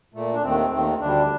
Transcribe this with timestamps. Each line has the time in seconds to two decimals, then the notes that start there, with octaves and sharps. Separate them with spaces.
0.14 A#2 A3
0.33 D4
0.42 D#2 D#3 A3 C4
0.71 D#2 D#3 A3
1.00 D2 D3 G3 D4